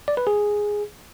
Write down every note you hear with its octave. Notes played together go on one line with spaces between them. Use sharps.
D5
B4
G#4